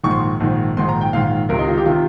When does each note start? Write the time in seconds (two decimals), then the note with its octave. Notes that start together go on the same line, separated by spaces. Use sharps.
0.03 A#1 G#2 D#3 C#6
0.11 C6
0.19 C#6
0.40 A#1 G#2 D#3
0.77 A#1 G#2 D#3 C6
0.89 A#5
1.01 G5
1.13 A#1 G#2 D#3 F5
1.49 C#2 C3 D#3 A#4
1.59 D#4
1.68 F4
1.78 G4
1.86 C3 D#3 F4